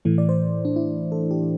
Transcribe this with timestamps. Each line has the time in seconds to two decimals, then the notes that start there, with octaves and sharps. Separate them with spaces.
0.05 A2 E3 A3
0.18 D5
0.29 C5
0.65 D4
0.76 E4
1.12 A4
1.31 G4